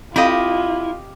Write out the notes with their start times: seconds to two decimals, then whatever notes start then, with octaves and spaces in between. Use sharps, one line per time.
0.16 C4 E4 F4 G4 A4 D#5 F5